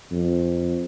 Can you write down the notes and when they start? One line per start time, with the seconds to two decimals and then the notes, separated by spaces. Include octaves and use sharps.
0.11 F2